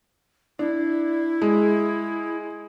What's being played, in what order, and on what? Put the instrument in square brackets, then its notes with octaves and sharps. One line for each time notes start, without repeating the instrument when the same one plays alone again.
[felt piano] D4 [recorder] E4
[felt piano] G#3